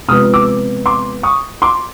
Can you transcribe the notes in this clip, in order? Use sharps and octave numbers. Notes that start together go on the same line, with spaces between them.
C3 F3 G#3 B3 D#6 F6
D6 E6
C6 D6
C#6 D#6
C6 D6